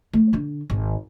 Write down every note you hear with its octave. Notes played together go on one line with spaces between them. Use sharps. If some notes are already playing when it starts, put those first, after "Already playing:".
A3
D3 D4
G#1